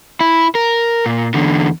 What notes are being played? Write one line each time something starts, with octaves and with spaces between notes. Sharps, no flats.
E4
A#4
A#2
E2 D3